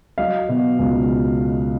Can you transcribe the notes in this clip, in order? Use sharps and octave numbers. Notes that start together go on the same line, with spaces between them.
F#3 D#5 F5
B2
C#2